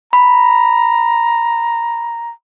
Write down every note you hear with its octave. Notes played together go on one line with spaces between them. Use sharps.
A#5 B5